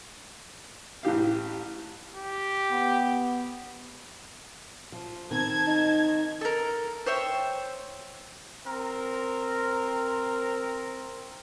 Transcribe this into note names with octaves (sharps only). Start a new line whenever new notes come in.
A1 E3 G4 F5
G4
B3
F3
D#3 C4 A5 G#6
D#4
A4 A#4
C5 C#5 E5 G5
C4 A#4